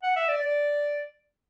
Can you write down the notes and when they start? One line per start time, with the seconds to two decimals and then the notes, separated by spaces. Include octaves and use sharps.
0.03 F#5
0.16 E5
0.28 D5
0.42 D5